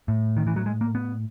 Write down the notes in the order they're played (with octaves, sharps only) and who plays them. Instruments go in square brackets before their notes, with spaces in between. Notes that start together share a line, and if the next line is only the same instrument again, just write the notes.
[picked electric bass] A2
D#3
E3
F#3
G#3
A#3
B3